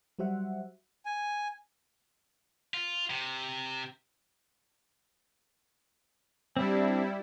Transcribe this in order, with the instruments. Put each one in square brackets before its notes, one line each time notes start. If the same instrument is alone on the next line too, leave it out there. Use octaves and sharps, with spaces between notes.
[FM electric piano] F#3 G3 F#4 C5 E5 F#5
[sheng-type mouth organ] G#5
[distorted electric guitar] F4
C3
[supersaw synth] G3 E4 [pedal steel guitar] C4 D4